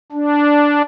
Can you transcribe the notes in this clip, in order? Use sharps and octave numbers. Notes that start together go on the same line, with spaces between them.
D4